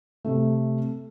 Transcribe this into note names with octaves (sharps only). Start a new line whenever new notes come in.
C3 A3